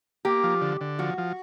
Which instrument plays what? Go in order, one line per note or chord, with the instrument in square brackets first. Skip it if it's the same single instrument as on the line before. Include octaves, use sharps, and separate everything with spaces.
[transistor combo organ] A#3 [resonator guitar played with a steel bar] G4
[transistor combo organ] F3
D3
D3
[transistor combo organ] F3 [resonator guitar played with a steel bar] F#4
[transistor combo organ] F3